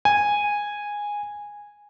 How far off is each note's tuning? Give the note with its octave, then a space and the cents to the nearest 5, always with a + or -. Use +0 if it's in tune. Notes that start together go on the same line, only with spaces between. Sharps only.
G#5 -10